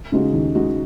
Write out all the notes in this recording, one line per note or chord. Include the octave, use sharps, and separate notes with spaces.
C#3 G#3 D#4 F#4
D#2
C#3 G#3 D#4 F#4